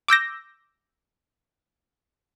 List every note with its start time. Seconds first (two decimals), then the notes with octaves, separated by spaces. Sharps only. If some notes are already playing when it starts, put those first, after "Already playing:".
0.08 D6 E6 G6 A#6